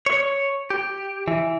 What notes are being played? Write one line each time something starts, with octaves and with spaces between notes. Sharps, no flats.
C#5
G4
E3